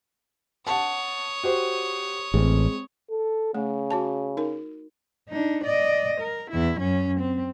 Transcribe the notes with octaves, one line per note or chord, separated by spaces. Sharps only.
C#5 F#5 A5 D#6
F#4 G4 C5
A1 G#3 C4
A4
C#3 A3
F#4 C#5 A5
D#4 A#4
D4 D#4
D5 D#5
A#4
E2 E4
F#2 C#4
C4